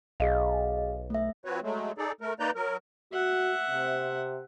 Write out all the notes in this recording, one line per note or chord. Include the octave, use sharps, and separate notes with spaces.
B1 G#4 D#5 F5
A3 E5
F3 C4 F#4 B4 C#5
F#3 G#3 A3
D#4 G#4 A4 D5
A3 A#4
A#3 D#4 B4 D5 A#5 G6
F#3 A#4
F#4 E5 F#5
C3